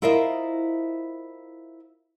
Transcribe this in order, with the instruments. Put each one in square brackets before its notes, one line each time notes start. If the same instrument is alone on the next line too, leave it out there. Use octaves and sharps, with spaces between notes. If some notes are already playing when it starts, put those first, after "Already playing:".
[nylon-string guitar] E4 F4 A#4 C5 D#5 E5